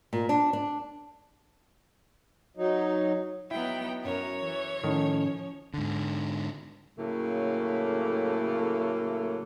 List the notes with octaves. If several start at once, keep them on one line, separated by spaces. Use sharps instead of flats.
A#2
D4
D4
F#3 D#4
F#3 B3 D#4 E4 G5
F#2 A#4 C#5
E3
A2 D#3 F3 C#4
G#2 D3
A2 C#3 F#3 A3 A#3